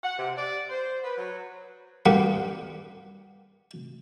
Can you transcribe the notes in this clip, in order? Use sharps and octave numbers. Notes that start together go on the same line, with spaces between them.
F#5
C3
D5
C5
B4
F#3
G2 G3 A#3 F#5